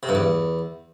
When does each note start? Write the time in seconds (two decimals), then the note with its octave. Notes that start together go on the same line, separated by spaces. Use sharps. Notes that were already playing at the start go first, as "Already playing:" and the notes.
0.03 C3
0.09 G2
0.15 E2